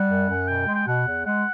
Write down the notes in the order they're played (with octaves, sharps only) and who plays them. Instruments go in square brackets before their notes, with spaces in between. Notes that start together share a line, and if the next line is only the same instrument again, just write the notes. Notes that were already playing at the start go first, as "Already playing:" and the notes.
Already playing: [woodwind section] G3 [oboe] F#5
[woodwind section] F#2
F#2
[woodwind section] B2 [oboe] G5
[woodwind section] G#3
[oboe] G5
[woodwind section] B2 [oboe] F#5
[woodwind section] E2
[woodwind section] G#3 [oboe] F#5